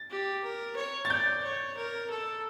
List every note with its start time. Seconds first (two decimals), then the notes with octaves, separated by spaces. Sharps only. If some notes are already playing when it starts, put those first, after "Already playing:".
Already playing: A6
0.10 G4
0.43 A#4
0.76 C#5
1.05 A6
1.10 D5 G6
1.43 C#5
1.77 A#4
2.10 A4